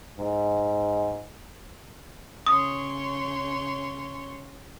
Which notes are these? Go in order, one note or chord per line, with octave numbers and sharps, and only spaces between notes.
G#2
C#3 C#5 C6 D#6